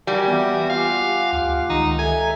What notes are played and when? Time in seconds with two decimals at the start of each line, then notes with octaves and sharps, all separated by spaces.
0.07 G3 F#4 A#4 D5 G#5
0.28 E3 B3 D5 E5
0.70 F4 G4 F5 F#5 G#5 D6
1.33 D2
1.70 C#2 D#3 D#4
1.99 A4 E5 G#5 A#5